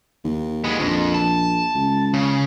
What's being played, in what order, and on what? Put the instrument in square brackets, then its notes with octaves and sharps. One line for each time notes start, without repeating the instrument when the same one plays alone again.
[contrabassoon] D#2
[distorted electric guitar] G#3 B3
[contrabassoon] A#1 [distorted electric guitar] F2
[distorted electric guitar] A5
[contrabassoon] C#2
[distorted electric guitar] C#3